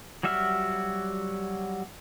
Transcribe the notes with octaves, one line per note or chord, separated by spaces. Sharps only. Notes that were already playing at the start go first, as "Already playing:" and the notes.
F#3 G3 F#4 E5 F6